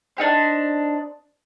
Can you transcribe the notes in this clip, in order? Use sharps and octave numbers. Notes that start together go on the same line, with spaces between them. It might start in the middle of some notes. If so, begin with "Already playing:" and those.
D4 D#4 G4 C5